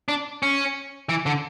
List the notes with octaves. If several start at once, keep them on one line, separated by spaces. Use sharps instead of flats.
D4
C#4
E3
D3